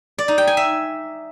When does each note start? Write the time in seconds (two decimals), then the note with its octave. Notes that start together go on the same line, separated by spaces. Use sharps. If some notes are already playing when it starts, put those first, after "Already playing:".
0.18 D5
0.28 D#4
0.38 G5
0.47 G#5
0.57 E5